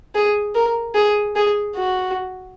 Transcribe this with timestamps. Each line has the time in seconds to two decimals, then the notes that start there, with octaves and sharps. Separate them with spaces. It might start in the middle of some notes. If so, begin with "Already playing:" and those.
0.15 G#4
0.55 A#4
0.95 G#4
1.36 G#4
1.76 F#4